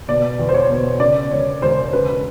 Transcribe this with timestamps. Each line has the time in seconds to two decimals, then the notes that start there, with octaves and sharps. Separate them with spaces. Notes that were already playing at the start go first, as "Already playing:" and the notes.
0.08 B2 D5
0.39 E2
0.49 C5
0.54 C#5
0.70 B2
1.00 C#3 D5
1.31 E1 C#5
1.62 E1 C5
1.93 C#3 B4